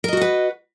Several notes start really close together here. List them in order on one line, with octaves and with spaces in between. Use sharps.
A#4 D#5 F#4 F#5 B4